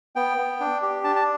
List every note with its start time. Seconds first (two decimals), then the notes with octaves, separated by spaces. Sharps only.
0.16 B3 G5
0.38 B3
0.60 D4
0.82 G4
1.04 D4 A5
1.16 A5